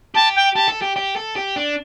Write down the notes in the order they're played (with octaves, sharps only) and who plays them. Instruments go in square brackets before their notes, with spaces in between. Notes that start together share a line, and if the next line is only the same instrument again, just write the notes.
[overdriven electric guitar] G4 [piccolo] A5
[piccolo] G5
[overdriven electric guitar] G4 [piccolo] A5
[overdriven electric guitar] A4
G4
G4
A4
G4
D4